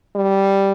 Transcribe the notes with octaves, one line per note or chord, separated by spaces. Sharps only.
G3